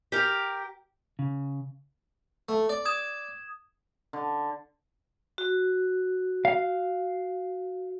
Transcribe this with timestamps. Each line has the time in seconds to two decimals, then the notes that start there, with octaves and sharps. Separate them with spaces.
0.12 G4 A#4
1.19 C#3
2.49 A3
2.69 D5
2.85 D#6 G#6 E7
4.13 D3
5.38 F#4
6.45 F5